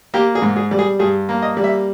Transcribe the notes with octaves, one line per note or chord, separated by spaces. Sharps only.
A#3 G4
G#4
G#2
G#4
G3
G#4
G2 G#4
A#3
D#5
G3
E5